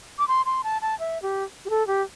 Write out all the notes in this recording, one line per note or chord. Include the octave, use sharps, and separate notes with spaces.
D6
C6
C6
A5
A5
E5
G4
G4
A4
G4